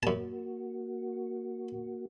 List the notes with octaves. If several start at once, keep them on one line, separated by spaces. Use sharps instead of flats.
F#2 A#3 F#4 A5